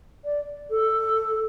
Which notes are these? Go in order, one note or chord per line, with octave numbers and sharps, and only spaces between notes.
D5
A4